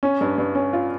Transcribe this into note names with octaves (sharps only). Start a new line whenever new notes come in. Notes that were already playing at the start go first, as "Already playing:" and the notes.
C#4
G2
G2
C#4
F4